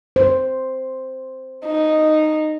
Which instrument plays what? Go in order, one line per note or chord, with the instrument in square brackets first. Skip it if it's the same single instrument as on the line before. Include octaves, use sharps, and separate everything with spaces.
[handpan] C5
[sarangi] D#4